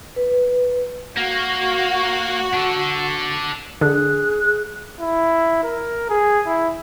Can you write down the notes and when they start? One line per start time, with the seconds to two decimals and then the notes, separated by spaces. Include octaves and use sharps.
0.16 B4
1.17 A#3 F#4
2.54 D4 A4
3.81 D3 G#4 F#6
5.00 E4
5.63 A#4
6.09 G#4
6.46 E4